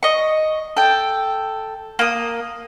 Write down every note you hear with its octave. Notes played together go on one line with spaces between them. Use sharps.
D#5 C#6
A4 G5
A#3 D#6